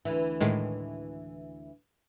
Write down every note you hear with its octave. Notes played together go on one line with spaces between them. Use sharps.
D2 E3
A2 D#3 G#3